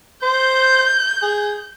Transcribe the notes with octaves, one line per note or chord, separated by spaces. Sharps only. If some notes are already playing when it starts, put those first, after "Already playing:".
C5 G6
G#4